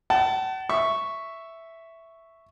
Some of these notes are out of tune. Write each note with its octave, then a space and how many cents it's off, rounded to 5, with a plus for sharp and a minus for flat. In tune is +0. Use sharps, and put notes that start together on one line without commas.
F#5 +45 A5 +0
E5 +0 C#6 +0